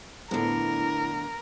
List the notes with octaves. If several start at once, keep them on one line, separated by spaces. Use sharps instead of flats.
A2 D3 F3 B3 D4 E4 A#4